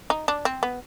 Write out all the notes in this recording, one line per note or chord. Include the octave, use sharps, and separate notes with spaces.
D#4
D4
C4
B3